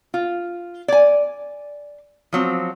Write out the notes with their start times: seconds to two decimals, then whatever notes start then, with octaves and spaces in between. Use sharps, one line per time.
0.14 F4
0.88 D5 G#5
2.33 F3 F#3 C4